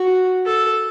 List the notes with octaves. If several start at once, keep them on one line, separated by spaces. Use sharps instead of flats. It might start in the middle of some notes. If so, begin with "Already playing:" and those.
Already playing: F#4
A4